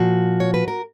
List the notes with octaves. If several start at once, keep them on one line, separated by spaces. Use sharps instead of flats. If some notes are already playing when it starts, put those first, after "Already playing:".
Already playing: A#2 F3 F#4
C#5
B4
A#4